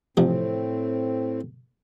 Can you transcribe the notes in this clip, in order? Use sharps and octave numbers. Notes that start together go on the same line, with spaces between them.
A1 A2 C3 F3 C4